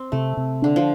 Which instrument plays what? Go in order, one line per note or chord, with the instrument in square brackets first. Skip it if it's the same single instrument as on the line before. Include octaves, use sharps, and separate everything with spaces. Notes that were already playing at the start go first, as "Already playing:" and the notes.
Already playing: [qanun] C4
[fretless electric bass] C3 [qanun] A3
[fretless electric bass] C3
[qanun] D3 [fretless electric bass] D4
[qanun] F3